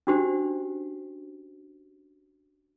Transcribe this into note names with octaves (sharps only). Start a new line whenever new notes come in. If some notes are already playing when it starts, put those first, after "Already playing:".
C#4 D4 F#4 G4 C5